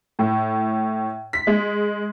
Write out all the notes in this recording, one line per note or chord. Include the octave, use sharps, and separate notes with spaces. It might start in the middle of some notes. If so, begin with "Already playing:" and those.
A2
B6
G#3